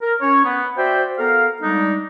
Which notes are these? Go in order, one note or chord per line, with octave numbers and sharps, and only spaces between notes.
A#4
C#4 C#5
B3
F#4 C5 D5 E5 G5
B3 A4 A#4 F5
G3 G#3 D4 D#4